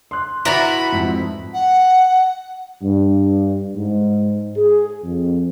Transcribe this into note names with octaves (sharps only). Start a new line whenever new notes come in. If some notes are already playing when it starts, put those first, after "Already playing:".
C6 F#6
E4 F#4 B4 D5 A#5 B5
F2 G#2
F#5
G2
G#2
G#4
F2